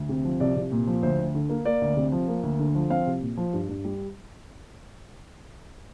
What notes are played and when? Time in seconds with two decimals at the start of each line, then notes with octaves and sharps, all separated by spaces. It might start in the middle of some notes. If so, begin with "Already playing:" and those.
Already playing: D2
0.09 C3
0.25 F3
0.40 C2 D5
0.56 C2
0.72 A#2
0.87 F3
1.03 D2 C5
1.19 D2
1.35 D3
1.49 A#3
1.65 A#3 D5
1.82 D2
1.97 C3
2.12 F3
2.28 A#3
2.43 D2
2.59 D3
2.75 F3
2.90 C4 F5
3.06 C2
3.22 A#2
3.37 F3
3.53 G2
3.69 G2
3.85 G3